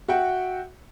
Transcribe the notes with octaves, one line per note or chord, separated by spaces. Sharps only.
F#4 E5 F#5 G5